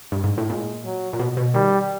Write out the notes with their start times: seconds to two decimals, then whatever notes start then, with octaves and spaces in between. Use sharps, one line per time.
0.12 G2
0.24 G#2
0.38 A2
0.50 A#2 G#3
0.85 F#3
1.13 A#2
1.19 B2
1.37 B2
1.54 D#3 G3